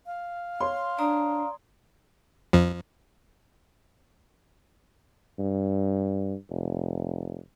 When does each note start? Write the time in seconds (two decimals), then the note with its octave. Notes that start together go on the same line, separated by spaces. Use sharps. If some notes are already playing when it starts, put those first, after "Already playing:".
0.06 F5
0.61 C#5 C6
0.99 D4 D5 A#5 D#6
2.53 F2 F3
5.39 G2
6.50 F1